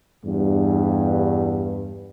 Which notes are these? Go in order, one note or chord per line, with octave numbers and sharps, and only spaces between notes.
E2 G2